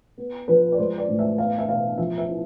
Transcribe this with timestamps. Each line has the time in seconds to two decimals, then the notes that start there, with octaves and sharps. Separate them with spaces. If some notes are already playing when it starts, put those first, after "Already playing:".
0.18 B3
0.48 F3 B4
0.72 D5
0.78 G#3 C5
0.98 D5
1.08 A2
1.19 E5
1.38 B3 F5
1.58 E5
1.69 B2 F5
1.98 F3 E5
2.18 E5
2.29 E4